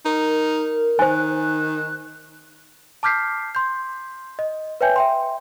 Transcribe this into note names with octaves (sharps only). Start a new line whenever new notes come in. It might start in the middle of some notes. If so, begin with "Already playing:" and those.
D#4 A#4
D#3 C5 G#5 F#6
A5 D6 F6 G6 B6 C7
C6 G6
D#5
B4 C#5 E5 G5 G#5 G6
E5 G5 C6